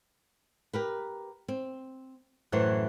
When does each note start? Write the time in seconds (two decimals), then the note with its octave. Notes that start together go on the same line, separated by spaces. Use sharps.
0.73 G4 A#4 B4
1.48 C4
2.52 F#2 A2 E3 B4 C5 F#6